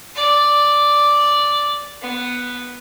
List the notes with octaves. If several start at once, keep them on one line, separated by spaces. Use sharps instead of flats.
D5
B3